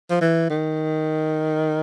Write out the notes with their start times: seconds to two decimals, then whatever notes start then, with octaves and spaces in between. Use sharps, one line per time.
0.10 F3
0.21 E3
0.50 D#3